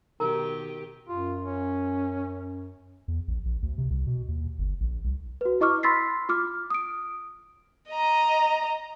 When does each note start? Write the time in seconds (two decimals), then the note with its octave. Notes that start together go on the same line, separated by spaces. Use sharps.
0.20 B2 D#3 D#4 G4 A#4 A#5
1.09 F#2 F4
1.44 C#4
3.08 E2
3.28 A#1
3.45 A#1
3.62 D2
3.78 C3
3.90 C2
4.07 B2
4.28 D#2
4.59 G1
4.80 A#1
5.04 C2
5.41 F#4 B4
5.61 E4 D#5 C#6 D6 F6
5.83 B5 C6 E6 A6 B6 C7
6.29 F4 D6 F6
6.70 D#6 D7
7.90 D#5 A#5